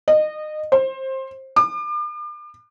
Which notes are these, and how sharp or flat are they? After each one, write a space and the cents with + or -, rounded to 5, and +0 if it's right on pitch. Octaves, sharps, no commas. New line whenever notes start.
D#5 -25
C5 +20
D6 +40